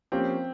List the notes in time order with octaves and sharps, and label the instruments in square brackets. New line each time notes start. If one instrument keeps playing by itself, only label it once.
[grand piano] F3 A#3 C#4 G4 [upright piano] C4